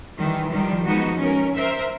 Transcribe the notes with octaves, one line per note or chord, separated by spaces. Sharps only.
D#3 E3 G3
D#3 F3 G3
F3 G#3 B3 D#4 F#4
C#4 A#4
A#4 C5 E5